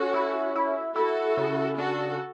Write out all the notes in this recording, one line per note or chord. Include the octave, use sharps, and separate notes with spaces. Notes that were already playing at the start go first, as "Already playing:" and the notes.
Already playing: C#4 F#4 A4
E4
E4
E4 F#4 A4
C#3
D4 F#4 A4